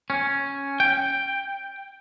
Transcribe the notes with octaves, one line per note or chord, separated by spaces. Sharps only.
C#4
G5